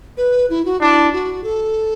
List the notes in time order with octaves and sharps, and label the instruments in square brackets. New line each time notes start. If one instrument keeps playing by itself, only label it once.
[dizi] B4
E4
F#4
[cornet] D4 [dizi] E4
[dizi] F#4
A4